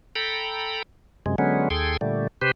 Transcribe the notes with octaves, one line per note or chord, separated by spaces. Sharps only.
A4 G5 A#5 B5
F#2 C3 G#3
D3 F#3 G#3 B3 C#4
D#2 G#4 A4 G5 C6 G#6
A#2 D3 G3 A3
C3 G4 B4 C5